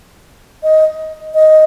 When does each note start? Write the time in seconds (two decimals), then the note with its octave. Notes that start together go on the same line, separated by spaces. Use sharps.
0.63 D#5
1.34 D#5